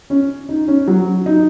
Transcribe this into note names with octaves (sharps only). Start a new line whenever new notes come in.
C#4
D#4
C#4
F#3
D#4